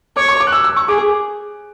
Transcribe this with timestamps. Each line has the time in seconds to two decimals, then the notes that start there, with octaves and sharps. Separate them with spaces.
0.17 C#5 D6
0.29 C#6
0.40 D6
0.47 F#6
0.52 E6
0.64 E6
0.76 C#6
0.88 G#4 D6